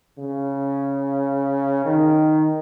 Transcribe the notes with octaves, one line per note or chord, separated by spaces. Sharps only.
C#3
D#3